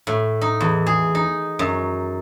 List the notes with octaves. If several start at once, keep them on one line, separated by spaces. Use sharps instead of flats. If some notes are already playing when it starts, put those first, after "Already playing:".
A2
D#4
E2
G#4
D#4
F#2